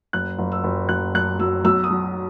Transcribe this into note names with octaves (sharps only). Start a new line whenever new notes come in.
F#1 F#6
F#1
E6
F#1
F#1 F#6
F#1 F#6
F#3 E6
B1 E6
D#6
F#3